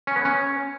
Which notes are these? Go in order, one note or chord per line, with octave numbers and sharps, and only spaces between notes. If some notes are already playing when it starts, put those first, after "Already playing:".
C#4
B3
C#4